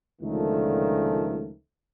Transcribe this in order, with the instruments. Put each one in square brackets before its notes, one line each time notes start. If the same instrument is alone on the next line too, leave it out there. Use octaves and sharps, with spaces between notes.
[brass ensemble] C#2 A#2 D3 D#3 F3 A3